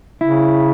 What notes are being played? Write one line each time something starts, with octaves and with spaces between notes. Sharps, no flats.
C#3 E4